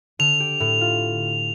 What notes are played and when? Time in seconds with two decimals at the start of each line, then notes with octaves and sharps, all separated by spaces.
0.19 D3 F7
0.40 G4
0.60 A2
0.81 F4